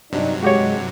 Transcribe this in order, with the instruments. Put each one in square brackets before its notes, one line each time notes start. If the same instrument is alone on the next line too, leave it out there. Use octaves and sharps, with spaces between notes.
[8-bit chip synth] G2 C3 F#3 [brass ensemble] D4 D#4
[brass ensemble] G#3 [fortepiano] F#4 G4 C#5